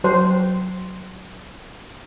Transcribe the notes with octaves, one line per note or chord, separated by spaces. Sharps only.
F#3 C5